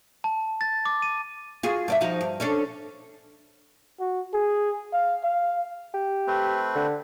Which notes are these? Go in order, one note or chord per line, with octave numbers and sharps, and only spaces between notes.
A5
A6
D6
D#7
F4 F#4 G#4
G2 D4 E5
F3 D#4 F#4
G2
C#4 D4 A4
F#4
G#4
F5
F5
G4
A3 C4 B4
D3